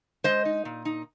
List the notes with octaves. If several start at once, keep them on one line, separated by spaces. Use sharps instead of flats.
G#3 C5 D#5
D#4
A#2
D#4